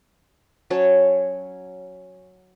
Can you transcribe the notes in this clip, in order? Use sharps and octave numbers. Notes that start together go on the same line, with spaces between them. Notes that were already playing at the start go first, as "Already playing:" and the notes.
F#3 C#4 C#5 A5